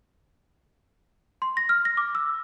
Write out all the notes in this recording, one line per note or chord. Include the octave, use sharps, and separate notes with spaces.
C6
A#6
F6
A#6
D6
E6